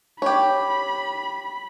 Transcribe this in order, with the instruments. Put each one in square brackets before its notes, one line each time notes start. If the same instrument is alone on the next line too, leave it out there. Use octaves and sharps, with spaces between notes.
[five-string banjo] G4 C#5 [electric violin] B5